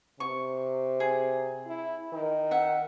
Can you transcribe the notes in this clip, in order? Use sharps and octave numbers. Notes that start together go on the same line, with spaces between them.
C3 C#6
G#4
E4
D#3
E5 F#5